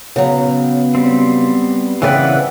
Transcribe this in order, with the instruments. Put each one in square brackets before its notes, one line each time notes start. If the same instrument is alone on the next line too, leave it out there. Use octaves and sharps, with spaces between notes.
[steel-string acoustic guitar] C#3 F#3 [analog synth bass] B3
[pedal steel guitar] G3 C4
[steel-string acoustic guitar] C#3 C4 B4 [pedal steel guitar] E3 D5 F#5